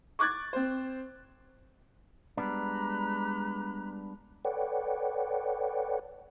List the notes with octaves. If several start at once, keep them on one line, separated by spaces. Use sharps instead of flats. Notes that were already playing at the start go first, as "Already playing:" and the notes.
C#6 D6 F#6 G#6 A6
C4 C5
G3 G#3 B3 D4 A#5 B5 F#6
A4 B4 C#5 D5 F#5 G5